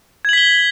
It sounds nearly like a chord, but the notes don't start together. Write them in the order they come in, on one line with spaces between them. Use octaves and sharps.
G#6 F#7 B6 G7